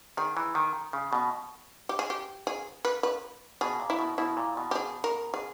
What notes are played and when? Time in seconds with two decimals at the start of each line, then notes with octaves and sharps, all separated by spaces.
0.17 D#3 G#4
0.37 E3
0.55 D#3
0.93 C#3
1.13 B2
1.89 G4
1.99 G#4
2.10 G4
2.47 G#4
2.85 B4
3.03 B4
3.61 B2 G#4
3.80 A#2
3.90 E4
3.99 B2
4.18 B2 E4
4.37 A#2
4.57 B2
4.71 G4
4.75 G#4
5.04 A#4
5.34 G#4